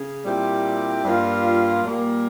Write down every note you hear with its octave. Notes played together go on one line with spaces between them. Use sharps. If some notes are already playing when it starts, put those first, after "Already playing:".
Already playing: C#3
A#2 G3 C4 E4 G4
G2 G3 A#3 F4
A#2 G3 A#3